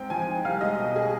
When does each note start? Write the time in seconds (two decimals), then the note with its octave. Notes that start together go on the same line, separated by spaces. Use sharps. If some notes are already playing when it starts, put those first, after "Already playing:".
Already playing: G#2 C4 G5
0.10 F3 G#5
0.28 D#4
0.44 C2 F5
0.61 G#3 D#5
0.79 B2
0.96 G#4